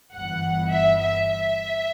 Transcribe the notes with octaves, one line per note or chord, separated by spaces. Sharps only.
G1 G2 E3 F#5
E5
E5
E5